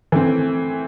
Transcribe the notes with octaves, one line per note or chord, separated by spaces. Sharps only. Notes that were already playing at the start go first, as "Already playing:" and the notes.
E3 A3 C4